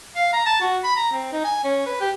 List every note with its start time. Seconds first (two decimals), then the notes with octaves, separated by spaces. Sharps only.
0.16 F5
0.33 A#5
0.46 A5
0.60 F#4
0.84 B5
0.97 A#5
1.12 C4
1.32 D#4
1.44 G#5
1.64 C#4
1.86 B4
2.01 G4